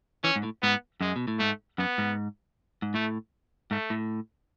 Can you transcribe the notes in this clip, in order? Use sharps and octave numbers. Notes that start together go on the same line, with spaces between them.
E3 C#4
G#2
A2
G#2 B3
F#2 G#3
B2
A2
G#2 A3
F#2 B3
G#2
G#2
A2 A3
G#2 A3
A2